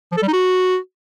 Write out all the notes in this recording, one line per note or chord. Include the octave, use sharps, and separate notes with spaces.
F3
A4
G3
D#4
F#4